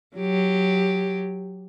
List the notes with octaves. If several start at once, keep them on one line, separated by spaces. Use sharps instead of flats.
F#3 G4